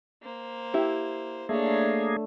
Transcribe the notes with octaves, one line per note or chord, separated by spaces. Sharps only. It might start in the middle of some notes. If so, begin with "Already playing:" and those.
A#3 C5
E4 G4
A3 A#3 D4 G#4 C#5